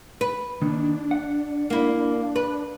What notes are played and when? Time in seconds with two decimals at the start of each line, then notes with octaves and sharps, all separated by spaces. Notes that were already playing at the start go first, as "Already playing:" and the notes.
0.21 B4
0.62 D#3 A#3 D4
1.11 F#5
1.70 A#3 E4
2.36 B4